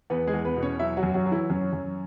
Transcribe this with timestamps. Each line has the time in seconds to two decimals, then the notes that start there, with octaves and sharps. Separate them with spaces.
0.10 E2 B3 B4
0.27 G#3 G#4
0.33 E2
0.45 B3 B4
0.56 B2
0.62 C#4 C#5
0.79 F#3 E4 E5
0.97 F#3 F#4
1.03 F#2
1.14 F#3 F#4
1.26 F#3
1.32 E3 E4
1.50 F#2 C#4
1.73 F#2